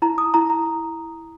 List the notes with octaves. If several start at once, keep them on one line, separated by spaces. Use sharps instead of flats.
E4 A#5
D#6
E4 A#5
A#5